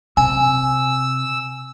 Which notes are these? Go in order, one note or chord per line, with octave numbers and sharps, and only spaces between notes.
C3 G#5 E6